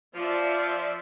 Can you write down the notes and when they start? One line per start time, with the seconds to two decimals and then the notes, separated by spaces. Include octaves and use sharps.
0.15 F3 F4 D5 E5